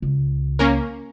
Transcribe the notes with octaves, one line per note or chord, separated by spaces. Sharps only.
C#2
A#3 C#4 A#4